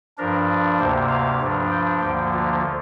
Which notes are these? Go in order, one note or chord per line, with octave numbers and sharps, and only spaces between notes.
G2 F3 D4 A#4
D2 C3 A#3 C5
F5
G2 F3 D4
G5
D2 D3 F3 A#3 G5
F4